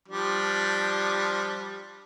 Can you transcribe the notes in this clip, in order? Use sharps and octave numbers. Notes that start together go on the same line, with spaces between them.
F3 G3 D4